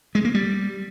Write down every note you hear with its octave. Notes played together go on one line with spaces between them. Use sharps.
G#3
A#3
G3